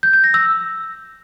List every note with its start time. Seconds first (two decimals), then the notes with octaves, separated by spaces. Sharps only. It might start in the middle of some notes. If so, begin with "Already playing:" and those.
0.03 G6
0.13 G6
0.24 A#6
0.34 E6